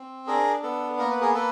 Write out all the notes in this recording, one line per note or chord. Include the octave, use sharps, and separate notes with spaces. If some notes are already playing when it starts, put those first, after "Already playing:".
Already playing: C4
D4 G#4 A#4
B3 A4
A#3 A#4
B4
G#4 A#4
A#3 A4 B4